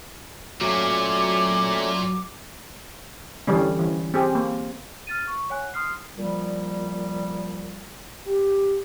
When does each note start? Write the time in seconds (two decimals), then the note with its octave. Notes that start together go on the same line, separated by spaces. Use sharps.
0.61 A#2 F#3 A3 C#4 D6
3.47 D3 E3 G3 C#4
3.79 E3 C#4
4.14 C4 G4 G#4
4.35 A#3
5.07 F6 A6 D#7
5.27 C#6
5.50 C#5 F#5 G#5 F#6
5.74 C6 D#6 F6 C7
6.17 A#2 F3 G3
8.27 G4